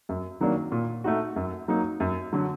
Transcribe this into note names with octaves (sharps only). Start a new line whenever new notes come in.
F#2
D#3 F#3 A#3 D4
A#2
A3 D#4 F#4
F#2
F#3 A#3 D#4
F#2
D3 F#3